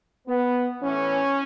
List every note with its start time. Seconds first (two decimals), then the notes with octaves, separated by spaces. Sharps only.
0.28 B3
0.82 A2 E3 C#4